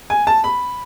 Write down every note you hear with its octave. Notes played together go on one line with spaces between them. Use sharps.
G#5
A5
B5